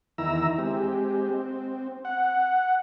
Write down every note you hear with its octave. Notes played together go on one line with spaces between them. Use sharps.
E2 D#3 E4 A#5 E6
G#3 C4 G4
C4
F#5